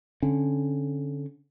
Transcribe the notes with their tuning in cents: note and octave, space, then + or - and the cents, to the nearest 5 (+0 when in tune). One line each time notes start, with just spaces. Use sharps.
D3 -25 C#4 -25